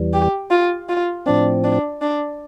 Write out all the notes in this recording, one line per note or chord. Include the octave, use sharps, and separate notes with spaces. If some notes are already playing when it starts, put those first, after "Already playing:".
Already playing: E2 E3 G3
G4
F4
F4
A2 F3 C4 D4
D4
D4